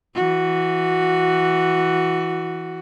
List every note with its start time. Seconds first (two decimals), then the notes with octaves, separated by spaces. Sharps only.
0.15 E3 F#4